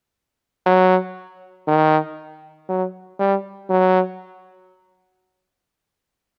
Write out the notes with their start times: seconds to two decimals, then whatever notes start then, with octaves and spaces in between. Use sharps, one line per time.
0.66 F#3
1.67 D#3
2.69 F#3
3.20 G3
3.70 F#3